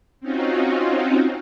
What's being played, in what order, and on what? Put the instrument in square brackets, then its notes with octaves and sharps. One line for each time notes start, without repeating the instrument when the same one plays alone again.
[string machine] C4 C#4 D#4 F4 F#4